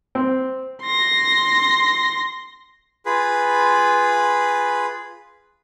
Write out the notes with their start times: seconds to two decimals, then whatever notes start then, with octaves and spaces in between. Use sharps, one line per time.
0.15 C4
0.83 C6 A#6
3.06 F4 G#4 B4 B5